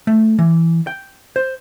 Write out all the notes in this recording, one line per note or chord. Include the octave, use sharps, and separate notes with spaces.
A3
E3
G5
C5